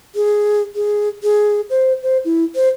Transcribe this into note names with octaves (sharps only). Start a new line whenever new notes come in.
G#4
G#4
G#4
C5
C5
E4
C5